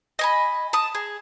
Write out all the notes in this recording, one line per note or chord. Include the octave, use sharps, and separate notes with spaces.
D#5 G#5 B5
A5 D#6
G#4